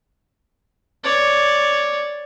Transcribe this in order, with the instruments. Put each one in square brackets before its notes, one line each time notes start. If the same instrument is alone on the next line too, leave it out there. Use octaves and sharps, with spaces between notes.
[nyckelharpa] C#5 D5